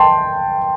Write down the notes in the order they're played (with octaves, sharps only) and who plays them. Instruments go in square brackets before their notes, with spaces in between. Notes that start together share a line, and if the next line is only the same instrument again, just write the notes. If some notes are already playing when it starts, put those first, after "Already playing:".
Already playing: [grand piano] G5 A5 C6